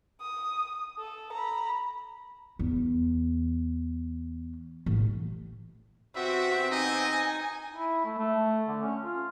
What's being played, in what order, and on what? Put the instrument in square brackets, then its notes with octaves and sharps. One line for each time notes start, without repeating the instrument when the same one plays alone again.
[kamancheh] D#6
A4
A#5 B5
[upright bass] E2
A1
[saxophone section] C3 B3 C4 [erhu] F#4 [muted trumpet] E5
[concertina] D#4 [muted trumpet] D#5 [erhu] G#5
[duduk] E4
A3
A3
D3
C#4
F4